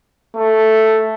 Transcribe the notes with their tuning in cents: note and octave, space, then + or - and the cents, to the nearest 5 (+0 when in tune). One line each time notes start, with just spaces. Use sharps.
A3 +0